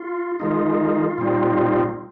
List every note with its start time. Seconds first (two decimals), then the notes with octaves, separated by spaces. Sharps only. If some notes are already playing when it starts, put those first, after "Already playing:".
Already playing: F4
0.40 D#3 G#3 D#4 F4
1.18 A#2 G3 C4 D#4